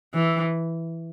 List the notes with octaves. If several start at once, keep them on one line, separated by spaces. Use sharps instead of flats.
E3